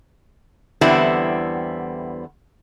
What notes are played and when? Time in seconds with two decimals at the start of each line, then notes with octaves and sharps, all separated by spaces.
0.81 E2 D3 G3 B3 C4 E4